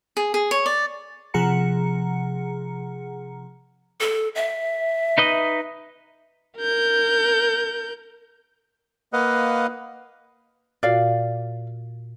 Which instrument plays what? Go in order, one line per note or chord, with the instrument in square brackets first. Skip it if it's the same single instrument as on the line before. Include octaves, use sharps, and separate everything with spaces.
[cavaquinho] G#4
G#4
C#5
D5
[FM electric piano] C3 F3 G#4 F#5 A#5 C#7
[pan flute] A4
E5
[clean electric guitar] D#4 B4 D#5
[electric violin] A#4 G6
[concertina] A#3 B4 D#5 F5 F#5
[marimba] A#2 F4 F#4 [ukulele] D5 F5